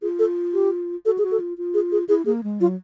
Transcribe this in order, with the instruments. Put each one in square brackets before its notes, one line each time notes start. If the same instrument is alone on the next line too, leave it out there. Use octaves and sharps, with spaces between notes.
[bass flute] F4 [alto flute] G#4
[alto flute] A4
G4
[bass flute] F#4 [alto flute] A4
[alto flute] G#4
[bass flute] F#4
[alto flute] A4
[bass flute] F4
F4
[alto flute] G#4
G#4
[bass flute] E4 [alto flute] G#4
[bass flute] A#3 [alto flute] G#4
[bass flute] G#3
[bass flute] F#3 [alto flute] F4